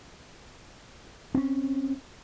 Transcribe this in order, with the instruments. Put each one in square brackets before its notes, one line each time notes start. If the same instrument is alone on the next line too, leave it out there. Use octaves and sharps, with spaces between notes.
[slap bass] C4 C#4